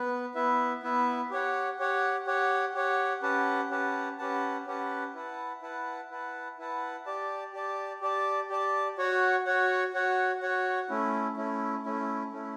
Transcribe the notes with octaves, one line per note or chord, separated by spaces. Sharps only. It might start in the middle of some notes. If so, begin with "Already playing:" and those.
Already playing: B3 B4
B3 E4 B4 E5
B3 E4 B4 E5
G4 C#5 F#5
G4 C#5 F#5
G4 C#5 F#5
G4 C#5 F#5
C#4 G4 B4 F#5 A5
C#4 G4 B4 F#5 A5
C#4 G4 B4 F#5 A5
C#4 G4 B4 F#5 A5
E4 B4 F#5 A5
E4 B4 F#5 A5
E4 B4 F#5 A5
E4 B4 F#5 A5
G4 D5 A5
G4 D5 A5
G4 D5 A5
G4 D5 A5
F#4 C#5 F#5
F#4 C#5 F#5
F#4 C#5 F#5
F#4 C#5 F#5
A3 C#4 E4
A3 C#4 E4
A3 C#4 E4
A3 C#4 E4